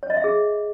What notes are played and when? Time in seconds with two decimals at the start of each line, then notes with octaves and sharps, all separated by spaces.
0.03 C#5
0.10 D#5
0.17 E5
0.24 G#4